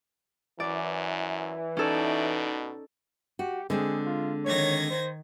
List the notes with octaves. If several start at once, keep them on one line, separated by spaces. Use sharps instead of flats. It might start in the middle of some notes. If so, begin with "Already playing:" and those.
F#2 E3 D5
B2 C#4 D#4 A4 D5
F#4 G4
D3 G#3 C4 G#4
F4
D#3 C#5 G#6 A#6
C5